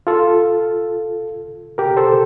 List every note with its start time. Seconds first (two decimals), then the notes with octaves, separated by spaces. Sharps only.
0.07 F4 A4
1.78 G4 A#4
1.97 A4 C5